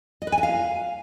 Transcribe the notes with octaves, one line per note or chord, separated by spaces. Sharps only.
D#5
B4
G#5
E5
F5